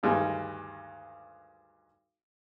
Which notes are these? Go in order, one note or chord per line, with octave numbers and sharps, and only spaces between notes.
D2 G2 D#3 G3 G#3